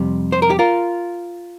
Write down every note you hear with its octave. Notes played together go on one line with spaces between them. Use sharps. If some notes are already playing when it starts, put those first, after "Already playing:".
Already playing: F2 C3 G3
C5
A#4
G4
F4 A#4